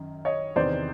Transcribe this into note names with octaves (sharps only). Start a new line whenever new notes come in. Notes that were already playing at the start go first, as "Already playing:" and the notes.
Already playing: F#2 D#3
C#5 D#5
E2 C3 D#3 C5 D5